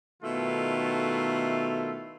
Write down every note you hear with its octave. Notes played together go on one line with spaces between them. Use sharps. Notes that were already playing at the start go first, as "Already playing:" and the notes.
B2 D#3 A3 E4 F4 A4